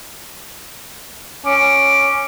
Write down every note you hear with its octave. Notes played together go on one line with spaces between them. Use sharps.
C#4 D6